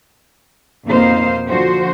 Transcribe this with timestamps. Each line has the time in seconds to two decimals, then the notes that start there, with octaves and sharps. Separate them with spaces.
0.87 F2 B2 A#3 D#4 C5 F5
1.49 D3 F3 F#4 C5